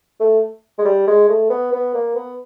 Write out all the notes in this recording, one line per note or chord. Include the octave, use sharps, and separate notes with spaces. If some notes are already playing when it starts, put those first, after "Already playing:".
A3
G#3
G3
G#3
A3
B3
B3
A#3
B3